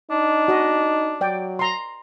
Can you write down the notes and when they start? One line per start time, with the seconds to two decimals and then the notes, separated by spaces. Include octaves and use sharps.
0.11 D4 D#4
0.48 F#4 D#5
1.21 F#3 D5 G5
1.59 A#5 C6